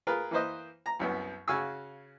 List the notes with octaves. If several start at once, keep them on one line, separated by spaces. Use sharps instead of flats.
F4 G#4 A#4 B4
E3 A#3 B4 C5 D#5
A#5
C2 F#2 B3
C#3 F#4 F5 G#5 C#6 E6